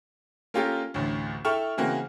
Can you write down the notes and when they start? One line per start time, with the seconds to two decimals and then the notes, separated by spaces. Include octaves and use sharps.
0.54 A#3 C#4 F4 G4 A4 A#4
0.94 A1 D2
1.45 E4 A4 G5 C#6 F6 E7
1.77 C#3 E3 A#3 C4 F#4